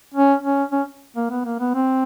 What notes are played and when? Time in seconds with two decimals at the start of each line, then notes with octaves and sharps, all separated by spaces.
0.14 C#4
0.43 C#4
0.72 C#4
1.16 A#3
1.30 B3
1.45 A#3
1.60 B3
1.74 C4